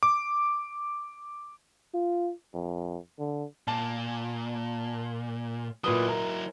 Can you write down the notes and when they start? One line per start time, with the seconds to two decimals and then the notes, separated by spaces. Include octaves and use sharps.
0.03 D6
1.94 F4
2.54 F2
3.19 D3
3.68 A#2 A5
5.84 A#2 F#3 E4 B4 D#6
6.08 A#4